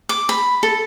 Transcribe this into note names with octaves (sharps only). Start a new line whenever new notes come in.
D6
B5
A4